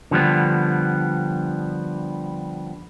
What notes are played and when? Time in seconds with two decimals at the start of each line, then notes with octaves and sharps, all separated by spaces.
0.11 D3 F3 G3 B3